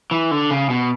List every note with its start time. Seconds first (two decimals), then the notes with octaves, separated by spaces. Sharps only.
0.11 E3
0.31 D3
0.51 C#3
0.70 B2